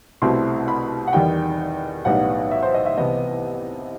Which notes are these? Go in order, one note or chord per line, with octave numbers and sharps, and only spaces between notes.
C2 B2 A3 C4 E4 C6
B5
F#5
E2 D#3 G3 D#4 G5
B1 A2 G3 B3 D#4 F#5
E5
C5
D#5
E5
C2 C3 E3 B3 E4 D#5